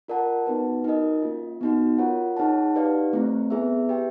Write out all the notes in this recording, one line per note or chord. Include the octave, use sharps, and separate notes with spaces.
F4 A#4 D5 F#5 A5
B3 D#4 F#4 B4
D#4 F#4 A#4 D#5
A#3 C#4 F4
B3 D#4 F#4
F4 A#4 C#5 F#5
D#4 G#4 C#5 F#5 A5
D#4 G4 B4 D5 F5
A3 C4 E4
B3 E4 G#4 B4 E5
G4 B4 E5 G5